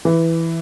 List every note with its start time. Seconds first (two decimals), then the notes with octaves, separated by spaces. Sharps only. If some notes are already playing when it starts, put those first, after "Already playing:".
0.05 E3